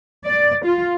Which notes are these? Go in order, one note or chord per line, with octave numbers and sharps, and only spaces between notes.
D5
F4